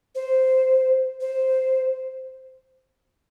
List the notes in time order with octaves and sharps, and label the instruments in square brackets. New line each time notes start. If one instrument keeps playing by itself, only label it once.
[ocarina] C5
C5